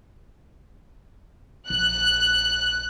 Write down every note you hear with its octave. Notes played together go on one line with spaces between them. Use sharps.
A#1 F#6